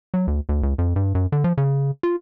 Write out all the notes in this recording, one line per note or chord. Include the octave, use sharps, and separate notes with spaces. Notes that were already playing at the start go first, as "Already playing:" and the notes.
F#3
D2
D2
C#2
F2
G2
F#2
D3
F3
C#3
F4